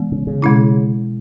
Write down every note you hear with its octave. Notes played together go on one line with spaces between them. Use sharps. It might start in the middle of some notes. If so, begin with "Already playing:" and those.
Already playing: E3 G#3 B3
C#3
C#3
B2 G#3 C#4 E4